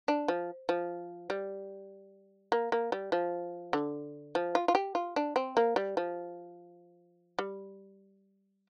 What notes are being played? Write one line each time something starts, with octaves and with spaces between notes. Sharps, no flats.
D4
F3
F3
G3
A#3
A#3
G3
F3
D3
F3
F4
F4
G4
F4
D4
C4
A#3
G3
F3
G3